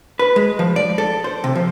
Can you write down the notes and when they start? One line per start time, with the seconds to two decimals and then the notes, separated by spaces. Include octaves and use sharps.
0.19 B4
0.36 G#3
0.59 F3
0.76 D5
0.98 A4
1.24 C5
1.44 C3
1.55 F3